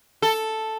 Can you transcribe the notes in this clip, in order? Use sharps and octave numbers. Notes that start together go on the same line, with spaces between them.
A4